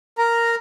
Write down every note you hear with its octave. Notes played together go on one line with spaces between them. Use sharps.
A#4 A#5